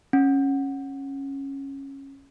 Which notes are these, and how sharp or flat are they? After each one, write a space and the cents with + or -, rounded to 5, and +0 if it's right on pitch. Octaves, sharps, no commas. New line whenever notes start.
C#4 -15